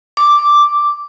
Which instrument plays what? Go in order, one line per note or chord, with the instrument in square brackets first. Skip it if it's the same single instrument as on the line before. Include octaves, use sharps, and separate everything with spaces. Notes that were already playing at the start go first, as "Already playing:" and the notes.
[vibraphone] D6